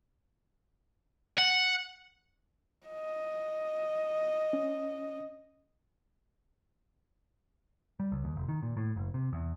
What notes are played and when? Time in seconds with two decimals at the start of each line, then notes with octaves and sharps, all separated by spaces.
1.38 F#5
2.87 D#5
4.53 C#4
8.00 G3
8.12 C#2
8.24 D#2
8.36 F1
8.48 D#3
8.63 A#2
8.77 A2
8.96 F#1
9.14 C3
9.33 E2